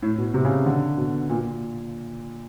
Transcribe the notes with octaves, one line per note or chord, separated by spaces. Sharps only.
A2
B2
C3
C#3
D3
B2
A#2